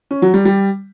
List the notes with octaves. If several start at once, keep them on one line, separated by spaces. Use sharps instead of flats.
C#4
F#3
G3
G3